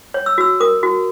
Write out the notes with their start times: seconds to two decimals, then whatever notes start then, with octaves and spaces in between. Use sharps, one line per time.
0.14 C#5
0.26 E6
0.38 F#4 E6
0.60 A#4 D#6
0.83 F#4